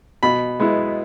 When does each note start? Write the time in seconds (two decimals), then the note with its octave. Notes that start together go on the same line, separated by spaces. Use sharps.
0.23 B2 B5
0.60 G#3 B3 E4